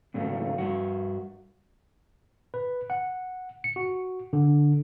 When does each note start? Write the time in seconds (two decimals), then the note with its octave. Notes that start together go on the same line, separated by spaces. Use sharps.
0.14 D#2 G#2 C#3 F#3 A3
0.58 G2 F#4
2.54 B4
2.90 F#5
3.64 C#7
3.76 F#4
4.33 D3